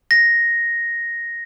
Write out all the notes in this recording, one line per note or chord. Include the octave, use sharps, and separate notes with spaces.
A#6